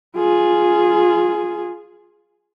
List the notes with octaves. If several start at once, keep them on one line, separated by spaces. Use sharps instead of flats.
F4 G#4